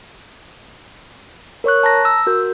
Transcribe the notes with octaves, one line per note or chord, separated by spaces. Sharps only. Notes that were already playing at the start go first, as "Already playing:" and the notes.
A#4 C#5 C#6 F#6
A5 A#5 A#6
E6
F#4 A#4 G6